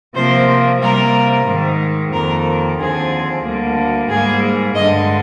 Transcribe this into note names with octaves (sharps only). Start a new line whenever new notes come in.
C3 F3 A#3 C5
C3 G3 A#3 A#4
G#2 D#3 G#3
F2 D#3 A#3 A#4
D#2 D3 F3 C4 G#4
D2 D3 G3 A#3
G#2 G3 A#3 G#4
G2 D3 G#3 D#5